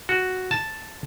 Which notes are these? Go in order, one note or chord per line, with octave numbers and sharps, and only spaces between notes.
F#4
A5